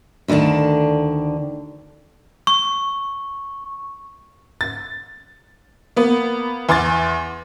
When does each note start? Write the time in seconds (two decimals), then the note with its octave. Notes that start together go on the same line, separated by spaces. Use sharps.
0.28 D2 D3 D#3 D5 A5
2.47 C#6
4.61 A6
5.96 A#3 B3
6.69 E2 C6 D6 A6